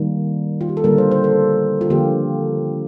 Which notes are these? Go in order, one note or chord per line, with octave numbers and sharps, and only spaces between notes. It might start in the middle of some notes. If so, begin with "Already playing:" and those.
Already playing: D#3 G3 A#3
F4
G4
A4
D3 G3 A#3 A#4
C5
C5
A4
F4
D3 F3 A#3 G4